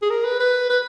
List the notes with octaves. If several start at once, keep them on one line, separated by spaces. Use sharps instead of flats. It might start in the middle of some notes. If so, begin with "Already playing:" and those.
G#4
A#4
B4
B4
B4